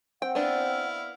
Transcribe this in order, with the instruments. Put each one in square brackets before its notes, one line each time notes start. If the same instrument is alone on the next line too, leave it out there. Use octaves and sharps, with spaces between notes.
[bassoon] C4 [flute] F#5 [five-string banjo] G5
[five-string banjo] B3 D4 [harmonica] E4 F5